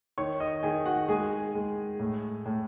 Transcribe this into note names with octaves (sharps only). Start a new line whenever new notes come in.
D#3 C#5 C#6
D#5 D#6
D#3 G#4 G#5
F#4 F#5
G#3 G#4 G#5
G#3
A2
A2